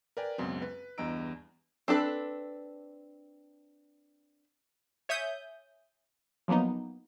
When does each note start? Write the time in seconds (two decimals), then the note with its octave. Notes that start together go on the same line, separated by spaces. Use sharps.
0.17 A#4 B4 D5 G5 G#5
0.38 C#2 F#2 B2 C4
0.62 B4
0.98 E2 G2 D#5 A#5 E6 D7
1.88 C4 D4 A4 B4
5.09 C#5 E5 G#5 D#6 G6
6.48 F3 F#3 A#3 B3 D#4